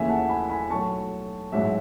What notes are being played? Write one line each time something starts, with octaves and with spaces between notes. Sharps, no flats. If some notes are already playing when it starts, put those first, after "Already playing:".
Already playing: D#2 C#3 E3 A3 E5 G#5
F#5 A5
G#5 B5
G#5 B5
B1 A2 F#3 A3 A5 C#6
A1 G#2 F#3 E5